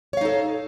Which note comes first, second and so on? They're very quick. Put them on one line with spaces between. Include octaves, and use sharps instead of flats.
C#5 F5 D#4 A4